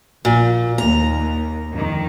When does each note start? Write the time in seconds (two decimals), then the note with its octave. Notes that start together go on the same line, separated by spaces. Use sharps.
0.25 A#1 A#2
0.78 D#2 A#5
1.71 F2 D#3